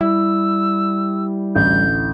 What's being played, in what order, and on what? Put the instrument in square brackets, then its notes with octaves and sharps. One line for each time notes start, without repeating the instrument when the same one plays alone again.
[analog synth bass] G3 [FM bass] E4 [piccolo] E6
[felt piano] A1 D2 [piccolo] G6